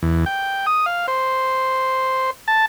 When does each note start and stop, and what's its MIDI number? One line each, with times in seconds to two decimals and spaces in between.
0.03 0.25 40
0.26 0.66 79
0.66 0.86 87
0.86 1.07 77
1.08 2.31 72
2.48 2.66 81